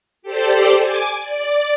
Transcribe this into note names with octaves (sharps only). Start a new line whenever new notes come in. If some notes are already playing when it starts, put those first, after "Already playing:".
G4 A4 C5 D5
G#5 D6
D5